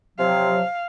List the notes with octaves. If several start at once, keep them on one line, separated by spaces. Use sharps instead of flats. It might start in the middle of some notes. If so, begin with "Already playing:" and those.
C3 F3 F#3 F5